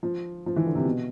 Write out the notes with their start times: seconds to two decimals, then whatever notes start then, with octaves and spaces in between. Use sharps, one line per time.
0.03 F3
0.46 F3
0.56 E3
0.66 D3
0.75 C3
0.85 B2